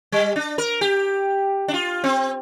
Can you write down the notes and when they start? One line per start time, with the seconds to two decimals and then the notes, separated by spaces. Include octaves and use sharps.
0.12 G3
0.36 D4
0.58 A#4
0.81 G4
1.68 D4
1.74 F4
2.04 C4